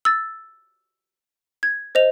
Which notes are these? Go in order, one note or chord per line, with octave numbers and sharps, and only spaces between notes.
E6 A6
G#6
C5 D#5 F7